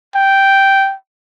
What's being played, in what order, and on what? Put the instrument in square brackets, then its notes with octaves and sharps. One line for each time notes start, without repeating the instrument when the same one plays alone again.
[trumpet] G5